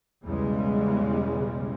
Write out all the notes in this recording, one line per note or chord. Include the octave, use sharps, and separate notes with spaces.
B1 E2 C#3 E3 G3 G#3